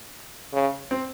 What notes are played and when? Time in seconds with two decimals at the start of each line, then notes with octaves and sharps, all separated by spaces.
0.53 C#3
0.91 C4